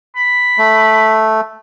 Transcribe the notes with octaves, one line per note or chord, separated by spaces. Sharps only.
B5
A3